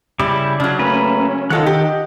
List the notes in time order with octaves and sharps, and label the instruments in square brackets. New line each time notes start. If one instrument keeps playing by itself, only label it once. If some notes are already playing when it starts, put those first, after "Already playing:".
[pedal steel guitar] C#3 E4 D6 [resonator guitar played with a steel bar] G3
[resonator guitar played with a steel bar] C#3 F#3 [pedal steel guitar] D4
[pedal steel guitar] A3 A#3 B4 [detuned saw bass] C#4
[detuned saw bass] D#3 [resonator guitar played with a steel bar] F4 A4 C#5 [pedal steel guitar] D#5 F#5 F#6
[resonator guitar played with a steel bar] G4